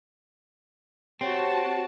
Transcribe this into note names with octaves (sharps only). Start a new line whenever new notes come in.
C4 F#4 G4 C#5 F#5 A5